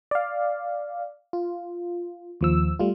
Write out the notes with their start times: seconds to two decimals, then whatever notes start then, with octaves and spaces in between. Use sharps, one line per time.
0.11 D5 F5
1.33 F4
2.41 D#2 F3 E6
2.79 G3 A3 F4